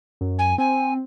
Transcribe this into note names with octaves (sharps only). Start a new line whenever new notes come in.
F#2
G#5
C4 G#5